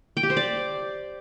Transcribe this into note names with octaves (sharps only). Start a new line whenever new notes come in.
G5
G4
C5
D5